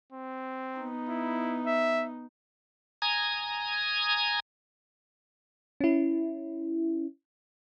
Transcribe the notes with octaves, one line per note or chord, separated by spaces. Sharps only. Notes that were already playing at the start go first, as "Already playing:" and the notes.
C4
B3 D#4
E4
E5
G#5 A#5 D#6 G#6
C#4 E4